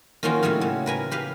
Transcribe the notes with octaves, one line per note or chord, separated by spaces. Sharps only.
D#3 F3 A#3 C#4 F4 F#4
A2 C#3 G3 E4 F#4
C#3
A#4 B4 G#5 A#5
G4 B4 F5